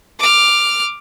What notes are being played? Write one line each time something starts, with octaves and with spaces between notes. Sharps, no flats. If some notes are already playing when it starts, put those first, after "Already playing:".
D6 F6